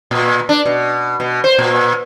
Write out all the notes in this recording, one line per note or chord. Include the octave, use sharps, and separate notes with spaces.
A#2
D4
B2
B2
C5
A#2